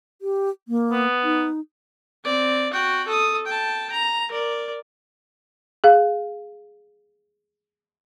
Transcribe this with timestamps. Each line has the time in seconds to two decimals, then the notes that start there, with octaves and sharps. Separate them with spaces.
0.22 G4
0.68 A#3
0.92 B3
1.24 D#4
2.24 C4 D5
2.73 F#4 G5
3.07 A4 D#6
3.47 G5 A5
3.92 A#5
4.31 A#4 D5
5.84 G#4 F5